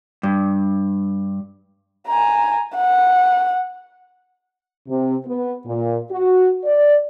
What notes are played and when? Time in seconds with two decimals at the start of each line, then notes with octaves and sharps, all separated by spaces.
0.23 G2
2.07 G#5 A#5
2.76 F#5
4.88 C3
5.26 B3
5.66 A#2
6.10 F#4
6.65 D5